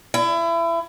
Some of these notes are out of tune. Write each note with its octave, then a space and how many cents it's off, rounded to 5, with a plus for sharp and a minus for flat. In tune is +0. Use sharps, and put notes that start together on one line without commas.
E4 +30